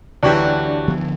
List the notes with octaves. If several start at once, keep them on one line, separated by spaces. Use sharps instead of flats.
D2 E3 F#3 D4 F#4 G4
D3 F3 B3